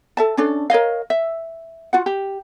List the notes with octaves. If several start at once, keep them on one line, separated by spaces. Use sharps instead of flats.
A4 E5 A5
C#4 D4 A4
A#4 C#5 D#5 F5
E5
F4 F#4 F#5
G4